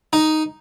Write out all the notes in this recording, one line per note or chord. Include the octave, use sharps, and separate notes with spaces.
D#4